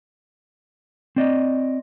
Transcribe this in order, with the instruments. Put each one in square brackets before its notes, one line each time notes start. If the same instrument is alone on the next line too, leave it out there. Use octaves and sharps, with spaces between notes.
[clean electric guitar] C4 D5 D#5